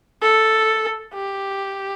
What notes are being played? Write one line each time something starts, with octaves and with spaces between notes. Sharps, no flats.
A4
G4